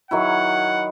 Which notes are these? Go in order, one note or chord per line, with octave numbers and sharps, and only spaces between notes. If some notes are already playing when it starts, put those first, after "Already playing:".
D#3 F#3 E4 F#5